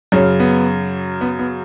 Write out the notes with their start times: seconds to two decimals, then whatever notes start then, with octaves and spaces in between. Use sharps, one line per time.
0.12 F#2 C#3 C#4
0.40 B3
1.21 B3
1.39 B3